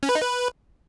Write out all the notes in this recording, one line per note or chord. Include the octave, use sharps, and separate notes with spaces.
C#4
B4
D#4
B4